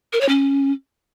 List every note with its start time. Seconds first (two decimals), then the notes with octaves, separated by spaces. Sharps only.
0.13 A#4
0.21 C#5
0.29 C#4